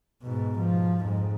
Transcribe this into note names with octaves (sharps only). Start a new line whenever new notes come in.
G#2 B2
F3
F2 G#2